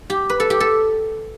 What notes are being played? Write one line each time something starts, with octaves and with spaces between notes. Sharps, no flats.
G4
B4
A4
G4
A4